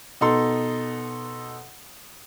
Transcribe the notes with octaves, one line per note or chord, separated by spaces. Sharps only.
B2 D#4 A4 C6